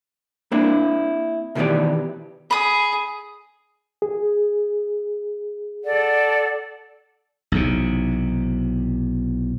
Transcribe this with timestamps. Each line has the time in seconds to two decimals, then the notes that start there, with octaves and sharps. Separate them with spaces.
0.52 A#3 C4 D4 E4
1.55 B2 D#3 E3 B3 G4 D5
2.51 G#4 B5 D#6
4.02 G#4
5.84 A4 D5 F#5
7.52 B1 E2 C3